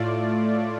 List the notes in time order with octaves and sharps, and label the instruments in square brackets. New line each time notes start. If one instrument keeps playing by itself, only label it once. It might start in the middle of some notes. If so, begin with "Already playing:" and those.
Already playing: [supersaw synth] A2 A3 F4 D5